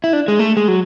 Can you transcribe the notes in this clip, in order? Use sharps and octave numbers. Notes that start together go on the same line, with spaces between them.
E4
D4
G#3
A3
G#3
F#3